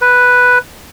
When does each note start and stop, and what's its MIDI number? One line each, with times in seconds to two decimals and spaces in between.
0.01 0.58 71